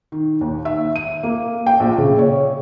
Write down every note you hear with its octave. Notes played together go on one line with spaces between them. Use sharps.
D#3
D#2
E5
D#7
A#3
G5
A#1
C#3
C#5